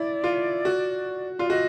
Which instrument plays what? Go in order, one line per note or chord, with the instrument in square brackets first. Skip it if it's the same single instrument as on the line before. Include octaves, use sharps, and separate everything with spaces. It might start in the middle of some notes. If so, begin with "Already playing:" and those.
Already playing: [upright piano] E4 [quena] D5
[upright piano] F4
F#4
[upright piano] F4 [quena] D5
[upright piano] F#4 [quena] D#5